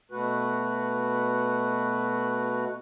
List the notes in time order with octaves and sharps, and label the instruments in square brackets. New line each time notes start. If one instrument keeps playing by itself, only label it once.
[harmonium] B2 A3 F#4 B4